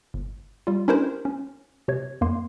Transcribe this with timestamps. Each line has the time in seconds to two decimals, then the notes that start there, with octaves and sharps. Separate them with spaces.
0.14 G1
0.67 G3 F4
0.88 C#4 D4 E4 G4 A#4 C5
1.25 C#4
1.88 C3 C#5 G#6
2.21 F2 A#3 C6